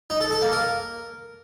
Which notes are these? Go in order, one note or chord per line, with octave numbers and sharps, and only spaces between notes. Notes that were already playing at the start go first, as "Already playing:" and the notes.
D#4
A4
A4
A#3
A#4